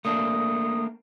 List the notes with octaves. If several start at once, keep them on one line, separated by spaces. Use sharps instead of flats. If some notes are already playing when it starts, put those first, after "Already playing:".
A3 A#3 D4 D#6